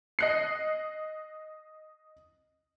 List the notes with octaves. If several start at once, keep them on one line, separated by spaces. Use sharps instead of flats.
D#5 F#6 C7